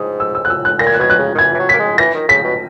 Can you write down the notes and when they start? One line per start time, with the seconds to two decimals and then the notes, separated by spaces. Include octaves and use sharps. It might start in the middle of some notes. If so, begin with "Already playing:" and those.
Already playing: G#2 D#6
0.20 E6
0.35 E6
0.45 F#6
0.50 E6
0.65 F#6
0.79 A#2 A#6
0.87 G#6
0.94 F#6
0.99 B2 G#6
1.10 F#6
1.19 C#3
1.35 D#3
1.38 E3 G#6
1.54 E3
1.59 F#3
1.69 B6
1.74 A#3
1.79 G#3
1.98 E3 A#6
2.14 D#3
2.28 C#3 B6
2.44 B2